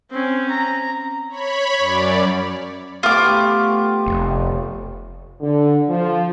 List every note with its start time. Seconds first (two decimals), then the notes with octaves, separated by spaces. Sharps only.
0.11 C4 C#4
0.50 A#5
1.30 C#5 B5
1.77 F#2 D5
3.03 A3 B3 F4 G4 D6
4.06 F1
5.41 D3
5.89 F3